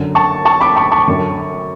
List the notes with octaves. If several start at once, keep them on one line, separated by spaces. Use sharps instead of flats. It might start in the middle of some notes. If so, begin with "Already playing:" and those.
Already playing: F#2 D3
A5 C#6
A5 C#6
B5 D6
A5 C#6
A5 C#6
F#2 D3